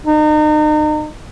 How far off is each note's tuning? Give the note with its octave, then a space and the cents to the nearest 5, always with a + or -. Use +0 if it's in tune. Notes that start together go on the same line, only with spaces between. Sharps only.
D#4 -35